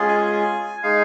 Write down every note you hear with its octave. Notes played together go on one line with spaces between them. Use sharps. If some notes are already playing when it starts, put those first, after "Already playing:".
Already playing: G#3 C#4 F4 G#4
G#5
G#5
G#3 D#4 G#4 F5